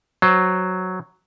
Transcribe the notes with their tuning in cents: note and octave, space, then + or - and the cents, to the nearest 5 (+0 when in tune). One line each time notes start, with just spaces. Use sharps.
F#3 +0 C5 +0